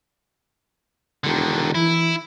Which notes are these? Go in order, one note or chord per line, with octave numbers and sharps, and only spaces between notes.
E1 D3 D#3
E3 E4